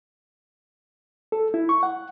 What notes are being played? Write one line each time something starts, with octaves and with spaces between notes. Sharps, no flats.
A4
E4
C#6
F#5